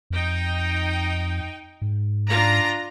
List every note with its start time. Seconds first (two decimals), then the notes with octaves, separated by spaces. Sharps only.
0.10 F2 D#4 G5
1.82 G#2
2.30 D4 F4 A#5